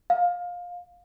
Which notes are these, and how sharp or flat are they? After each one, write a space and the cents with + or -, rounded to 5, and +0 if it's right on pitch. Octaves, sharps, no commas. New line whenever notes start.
F5 +20